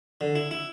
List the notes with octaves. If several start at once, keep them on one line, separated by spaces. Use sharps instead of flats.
D3
E4
E4